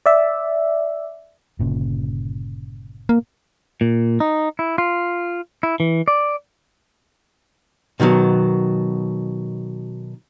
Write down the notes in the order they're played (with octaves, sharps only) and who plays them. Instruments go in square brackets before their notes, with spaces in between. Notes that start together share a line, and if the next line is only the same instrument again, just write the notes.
[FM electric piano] D5 E5
[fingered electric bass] G1 A#2 C#3
[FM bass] A#3
[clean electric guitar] A#2
D#4
E4
F4
E4
E3
D5
[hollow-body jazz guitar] B2 D#3 F3 F#3 B3